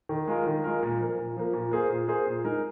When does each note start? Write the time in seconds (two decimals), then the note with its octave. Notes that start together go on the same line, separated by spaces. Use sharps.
0.09 D#3
0.27 G#3 F4 A#4
0.46 D#3
0.64 G#3 F4 A#4
0.83 A#2
1.00 F3 A#3
1.19 A#2
1.37 F3 A#3
1.54 A#2
1.71 A#3 G#4 C5
1.89 A#2
2.08 A#3 G#4 C5
2.27 A#2
2.44 G#3 D#4 A#4